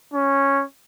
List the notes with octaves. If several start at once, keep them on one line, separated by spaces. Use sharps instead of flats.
C#4